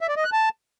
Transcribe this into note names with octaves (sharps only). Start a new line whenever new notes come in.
E5
D5
D#5
F#6
A5